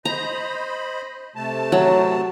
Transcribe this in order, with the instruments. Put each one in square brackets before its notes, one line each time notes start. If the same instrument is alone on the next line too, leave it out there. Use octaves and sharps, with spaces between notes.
[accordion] C5 D#5 B5 [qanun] A#5
[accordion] C3 A3 A5
[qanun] F#3